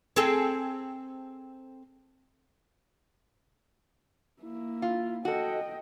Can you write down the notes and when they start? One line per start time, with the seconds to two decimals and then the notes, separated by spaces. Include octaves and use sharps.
0.16 C4 G#4 A4
4.42 A#3 E4
4.82 F4
5.25 F#4 A4 D#5 G5